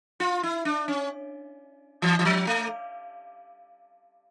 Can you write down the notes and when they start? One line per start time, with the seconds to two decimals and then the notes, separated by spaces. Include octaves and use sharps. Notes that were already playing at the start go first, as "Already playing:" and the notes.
0.20 F4
0.43 E4
0.65 D4
0.88 C#4
2.02 E3
2.19 E3
2.25 F3
2.47 A3